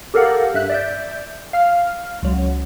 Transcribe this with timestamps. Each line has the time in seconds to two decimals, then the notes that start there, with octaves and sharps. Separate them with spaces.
0.14 G4 A4 A#4 F5 F#5
0.54 G2 E5 F#6
0.70 D5 E5 G6
1.53 F5 F6
2.23 C#2 F#3